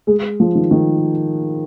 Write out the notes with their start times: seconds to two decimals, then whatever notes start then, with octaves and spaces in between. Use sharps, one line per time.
0.07 G#3
0.40 F3
0.55 D#3
0.71 D#3